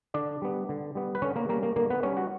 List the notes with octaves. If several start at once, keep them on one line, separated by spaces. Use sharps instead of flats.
D3 D4 D5
G3 B3
D3
G3 B3
B4
D3 C#4 C#5
A#3 A#4
G3 A#3 C#4 A#4
A#3 A#4
D3 A#3 A#4
B3 B4
G3 C#4 C#5
F#4 F#5